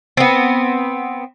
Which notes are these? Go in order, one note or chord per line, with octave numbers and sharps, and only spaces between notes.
B3 C4